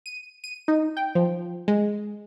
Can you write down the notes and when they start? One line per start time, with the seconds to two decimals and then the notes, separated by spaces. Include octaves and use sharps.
0.06 D#7
0.44 D#7
0.68 D#4
0.97 G5
1.15 F3
1.68 G#3